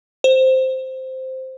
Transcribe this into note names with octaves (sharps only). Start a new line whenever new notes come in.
C5